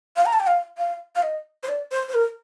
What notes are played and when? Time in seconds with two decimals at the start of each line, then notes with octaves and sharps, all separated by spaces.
0.16 F5
0.26 A#5
0.33 A5
0.40 G5
0.47 F5
0.78 F5
1.16 F5
1.23 D#5
1.63 C5
1.69 D5
1.91 C5
2.09 C5
2.14 A#4